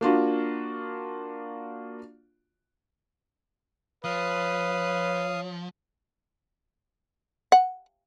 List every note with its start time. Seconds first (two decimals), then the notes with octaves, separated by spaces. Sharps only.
0.01 A#3 D4 F4 F#4
4.04 F3 B4 C#5 F5 D#6
7.52 F#5